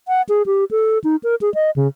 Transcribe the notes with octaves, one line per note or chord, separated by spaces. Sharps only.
F#5
G#4
G4
A4
D#4
A#4
G#4
D#5
C#3